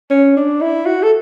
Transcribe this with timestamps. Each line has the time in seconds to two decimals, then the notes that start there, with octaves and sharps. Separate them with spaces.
0.10 C#4
0.37 D4
0.61 E4
0.86 F#4
1.03 A4